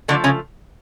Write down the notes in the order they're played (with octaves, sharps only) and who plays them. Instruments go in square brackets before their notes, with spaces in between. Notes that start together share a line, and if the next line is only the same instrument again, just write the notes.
[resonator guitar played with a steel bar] D3 F3 A3 D4
C#3 C#4